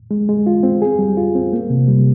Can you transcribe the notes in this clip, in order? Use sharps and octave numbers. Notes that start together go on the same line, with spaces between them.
G#3
G#3
F4
C4
G#4
G3
F4
C4
A#3
C3
G3